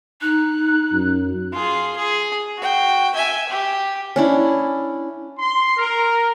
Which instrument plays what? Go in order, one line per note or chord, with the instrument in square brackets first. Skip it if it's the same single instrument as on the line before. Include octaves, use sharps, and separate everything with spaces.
[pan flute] D#4 [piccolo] F#6
[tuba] F#2
[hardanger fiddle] F4 G#4
G#4
F#4 G5
E5 G#5
G4
[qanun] C#4 D4 E4
[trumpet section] C6
A#4